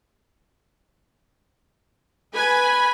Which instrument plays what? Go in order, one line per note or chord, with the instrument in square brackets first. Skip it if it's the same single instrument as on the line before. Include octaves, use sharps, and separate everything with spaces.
[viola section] B4 G#5 B5